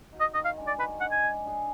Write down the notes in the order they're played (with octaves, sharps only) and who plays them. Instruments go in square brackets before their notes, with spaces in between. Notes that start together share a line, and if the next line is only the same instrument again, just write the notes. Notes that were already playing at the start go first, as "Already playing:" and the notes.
[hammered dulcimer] D#4 F#4
[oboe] D#5
[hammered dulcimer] D#3 [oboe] D#5
[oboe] F5
[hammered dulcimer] G#3 D4
[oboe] D5
[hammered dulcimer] D#3 [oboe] B4
[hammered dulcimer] D4 [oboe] F#5
[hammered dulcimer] G#3
[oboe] G#5
[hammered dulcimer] G#3
D4 G#4